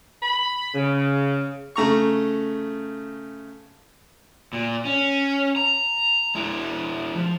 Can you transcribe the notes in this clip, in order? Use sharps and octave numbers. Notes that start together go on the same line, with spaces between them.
B5
C#3
C#3 A3 A#5 C#6
A#2
C#4
A#5
G#3 E4
F3